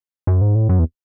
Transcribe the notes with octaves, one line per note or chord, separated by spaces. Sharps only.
F#2
G#2
A2
F#2
E2